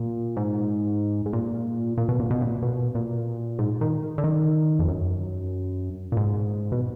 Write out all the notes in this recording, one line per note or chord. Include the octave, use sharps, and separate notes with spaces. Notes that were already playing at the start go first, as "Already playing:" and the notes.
Already playing: A#2
G#2
G#2
A#2
A#2
B2
A#2
B2
A#2
B2
A#2
G#2
D#3
D3
D#3
F2
F#2
A#2
G#2
B2